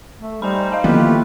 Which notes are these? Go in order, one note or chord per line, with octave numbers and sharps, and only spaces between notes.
A3
G3 D#4 C5 G#5 B5
D#5 F5 A5
D3 D#3 F3 A#3 B3 F4 G4 B4
A3